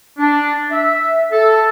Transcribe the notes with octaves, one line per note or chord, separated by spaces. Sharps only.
D4
E5
A4